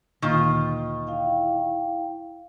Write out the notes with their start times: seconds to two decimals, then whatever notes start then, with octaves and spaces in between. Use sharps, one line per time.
0.22 D2 A#2 D#3 A#3 F4
1.07 E4 F5 G5